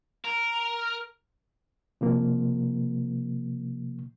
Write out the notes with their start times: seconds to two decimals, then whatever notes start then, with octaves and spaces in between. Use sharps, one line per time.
0.25 A#4
2.01 C3 F3 A#3